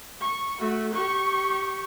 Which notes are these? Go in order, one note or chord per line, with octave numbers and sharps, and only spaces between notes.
C#6
A3 F#4
G4 C#6